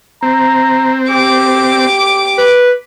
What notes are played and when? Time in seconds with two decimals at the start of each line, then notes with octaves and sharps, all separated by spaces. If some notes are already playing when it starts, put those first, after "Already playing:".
0.23 C4 A#5
1.10 G4 D6
2.38 B4